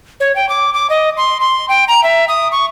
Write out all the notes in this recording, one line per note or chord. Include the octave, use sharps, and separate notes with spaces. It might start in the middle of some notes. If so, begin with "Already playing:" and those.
C#5
G5
D6
D6
D#5
C6
C6
G5
A#5
E5
D#6
C#6